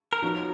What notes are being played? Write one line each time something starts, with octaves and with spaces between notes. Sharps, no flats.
A#4
F3 B3 D#4 F#4 C#5